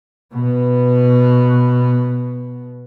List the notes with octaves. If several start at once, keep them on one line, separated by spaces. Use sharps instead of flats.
B2 B3